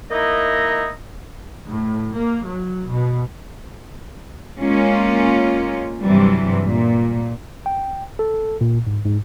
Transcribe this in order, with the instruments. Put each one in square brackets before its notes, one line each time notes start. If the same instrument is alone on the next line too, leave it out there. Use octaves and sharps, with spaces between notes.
[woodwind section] A#3 D#4 E4 D#5
[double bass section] A2
A#3
F#3
B2
[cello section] G#3 A#3 C#4 F4
G2 C3 E3 F#3 G3
A#2
[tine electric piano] G5
A4
A#2
G#2
G#2